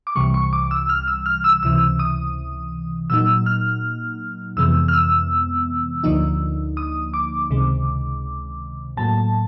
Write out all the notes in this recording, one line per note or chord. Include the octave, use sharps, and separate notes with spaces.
D6
C2 C3 E3 G3 C#6
C#6
D6
E6
F6
E6
F6
E6
C#2 C3 E3 E6
D#6
A#2 F#3 A#3 D#4 E6
F6
F2 C3 E3 G#3 B3 E6
F6
E6
D2 D3 F3 A#3 D#4
D#6
D6
C#2 C3 D#3 G#3
A2 F#3 A#3 A5